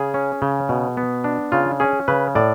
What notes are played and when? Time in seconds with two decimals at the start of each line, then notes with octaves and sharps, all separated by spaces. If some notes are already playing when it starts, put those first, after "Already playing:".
Already playing: C#3 G#4
0.14 C#4
0.42 C#3
0.69 B2
0.97 B3
1.24 D4
1.52 C#3 F4
1.80 C#4 G#4
2.08 C#3 B4
2.35 A2 D5